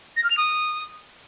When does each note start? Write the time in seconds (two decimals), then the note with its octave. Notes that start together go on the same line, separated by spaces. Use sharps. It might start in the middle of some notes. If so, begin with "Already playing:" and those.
0.16 A#6
0.23 F6
0.30 F7
0.37 D#6